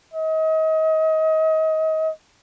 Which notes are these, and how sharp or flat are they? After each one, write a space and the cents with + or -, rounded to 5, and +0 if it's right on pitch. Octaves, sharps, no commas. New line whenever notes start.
D#5 +30